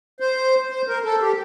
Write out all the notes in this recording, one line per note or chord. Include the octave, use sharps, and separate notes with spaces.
C5
C5
A#4
A4
G4